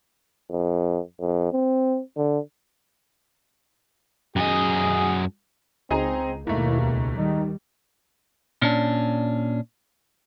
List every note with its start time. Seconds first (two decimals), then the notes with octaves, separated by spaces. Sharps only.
0.50 F2
1.20 F2
1.53 C4
2.17 D3
4.36 F#2 G#4 D#5
5.90 C#2 C4 D#4 G#4 A#5
6.47 D#2 G#2 B2 A3 A#3 E4
6.79 C#2
7.18 D#3 G3 D#4
8.62 A#2 C#4 D4